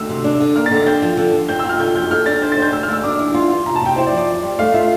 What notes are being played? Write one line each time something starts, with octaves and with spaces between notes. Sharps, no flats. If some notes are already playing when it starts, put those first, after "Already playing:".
Already playing: D2 E6
C3
D4
D3
A#3 F6
A6
D3
A6
C4 G6
F3
D3
F3
C4 G6
E6
F4 F6
D3 G6
F2 G6
A4 F6
D4 A6
C5 G6
A6
C5
G6
D2 E6
F6
D2 E6
D4 D6
E3
F4 C6
F4
C3 A#5
A5
C3 G5
E4 C5
D5
F3
D5
F2
G3
A3 F5
F4 E5